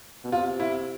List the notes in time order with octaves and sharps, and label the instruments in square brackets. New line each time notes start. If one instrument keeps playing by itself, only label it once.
[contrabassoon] B2
[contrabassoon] C3 [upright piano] F4
[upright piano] E4